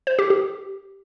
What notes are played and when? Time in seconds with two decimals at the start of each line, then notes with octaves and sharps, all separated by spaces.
0.07 C5
0.19 G4
0.30 G4